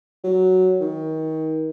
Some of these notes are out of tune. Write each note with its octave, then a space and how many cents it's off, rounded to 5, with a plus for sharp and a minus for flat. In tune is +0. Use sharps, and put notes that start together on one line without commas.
F#3 +5
D#3 +30